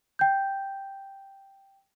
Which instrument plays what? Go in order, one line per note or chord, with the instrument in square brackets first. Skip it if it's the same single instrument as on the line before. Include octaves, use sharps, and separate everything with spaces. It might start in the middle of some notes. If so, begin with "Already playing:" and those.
[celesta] G5 G6